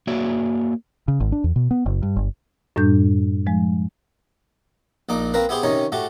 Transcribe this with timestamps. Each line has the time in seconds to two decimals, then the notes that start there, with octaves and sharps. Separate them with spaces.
0.07 A#3 F#4 C#5 D5 E5
1.08 C#3
1.20 G#1
1.32 D4
1.44 E2
1.56 B2
1.71 B3
1.86 F#1
2.02 G2
2.16 G1
2.76 F#2 A2 G3 D4 G6
3.47 F3 G#3
5.09 A#1 A#2 D#4 D6
5.34 A#3 C4 A#4 B4
5.49 B3 E4 G4 G#4 C5
5.63 C3 D#3 C#4 D#4 C#5
5.92 A2 A3 F#4 G4